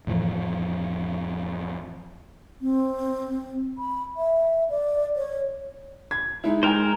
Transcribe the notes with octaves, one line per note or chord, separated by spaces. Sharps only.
F2 A2 E3 F3
C4
B5
E5
D5
C#5
G#6
G#3 D#4 E4
G#3 A#4 C5 G5 G#5